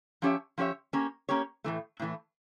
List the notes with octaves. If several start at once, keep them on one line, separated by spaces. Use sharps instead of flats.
F3 C#4 G4 C#5 E5
F3 C#4 G4 C#5 E5
A#3 C#4 G4 C#5
A#3 C#4 G4 C#5
A2 E3 A3
A2 E3 A3